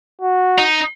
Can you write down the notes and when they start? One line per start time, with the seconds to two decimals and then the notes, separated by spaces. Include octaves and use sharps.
0.21 F#4
0.59 D#4